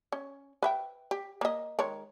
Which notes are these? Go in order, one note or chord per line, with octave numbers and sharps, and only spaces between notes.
C#4
B4 E5 G5
G4
A#3 D#5
D#3 G#3 C#5